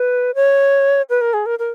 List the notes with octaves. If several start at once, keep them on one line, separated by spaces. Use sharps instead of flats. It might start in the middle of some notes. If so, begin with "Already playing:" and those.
Already playing: B4
C#5
B4
A#4
G#4
A#4
A#4